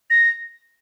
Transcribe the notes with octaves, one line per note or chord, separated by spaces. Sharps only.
A#6